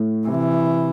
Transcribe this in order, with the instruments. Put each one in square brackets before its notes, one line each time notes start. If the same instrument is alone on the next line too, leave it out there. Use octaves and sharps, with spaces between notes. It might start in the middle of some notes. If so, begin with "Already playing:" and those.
Already playing: [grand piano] A2
[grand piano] C3 [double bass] E3